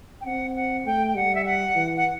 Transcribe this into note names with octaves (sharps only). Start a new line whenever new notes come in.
G5
C4 F#5
F#5
A3 G5
G5
G3 F#5
E5
F#5
E3
F#5